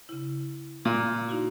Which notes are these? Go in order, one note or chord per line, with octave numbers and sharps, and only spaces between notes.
C#3 E4
A#2
D#4 E4 F#4